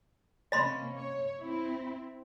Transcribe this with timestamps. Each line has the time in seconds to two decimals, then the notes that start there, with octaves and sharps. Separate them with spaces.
0.52 C3 A#3 C#4 D#5 B5 C6
0.95 C#5
1.40 C4 E4